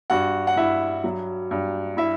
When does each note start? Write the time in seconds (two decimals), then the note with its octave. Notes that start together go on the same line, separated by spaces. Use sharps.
0.10 G2 F#4 F#5
0.47 F#5
0.57 G2 E4 E5
1.04 F#3
1.51 G2
1.97 E4 E5